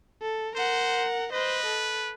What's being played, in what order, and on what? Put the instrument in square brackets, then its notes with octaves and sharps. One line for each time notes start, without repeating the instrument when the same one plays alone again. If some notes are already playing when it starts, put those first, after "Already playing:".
[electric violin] A4
[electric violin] A#4 F#5 [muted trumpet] C5
[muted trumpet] B4 [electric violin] C5 D#5
[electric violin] A4